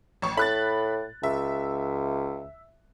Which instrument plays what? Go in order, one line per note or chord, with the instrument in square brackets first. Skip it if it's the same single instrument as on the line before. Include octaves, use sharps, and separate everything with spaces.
[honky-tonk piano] A1 C#6
[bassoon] A2 [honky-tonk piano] B5 F#6 A6
[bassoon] C#2 [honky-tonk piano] E5